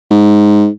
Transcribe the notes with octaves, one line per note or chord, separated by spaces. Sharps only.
G#2